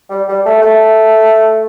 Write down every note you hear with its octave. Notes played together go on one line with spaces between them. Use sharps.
G3
G3
A3
A3